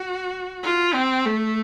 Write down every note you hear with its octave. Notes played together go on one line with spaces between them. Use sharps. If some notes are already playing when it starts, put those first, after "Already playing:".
Already playing: F#4
F4
C4
A3